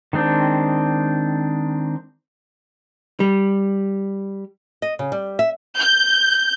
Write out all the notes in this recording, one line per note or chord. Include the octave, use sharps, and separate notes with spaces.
D#3 G#3 C4 D4
G3
D#5
C#3
G3
E5
G6